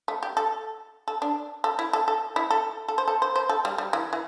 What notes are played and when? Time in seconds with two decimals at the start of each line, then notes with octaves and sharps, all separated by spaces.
0.08 A3
0.23 G4
0.37 A4
1.08 A4
1.22 D4
1.64 A4
1.79 E4
1.93 A4
2.08 A4
2.36 E4
2.50 A4
2.88 A4
2.98 C5
3.07 A4
3.22 C5
3.36 C5
3.49 A4
3.65 G3
3.78 G3
3.93 E3
4.13 E3